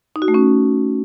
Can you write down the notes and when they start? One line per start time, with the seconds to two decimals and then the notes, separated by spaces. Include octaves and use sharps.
0.16 D#4
0.22 F#4
0.28 A3
0.34 C#4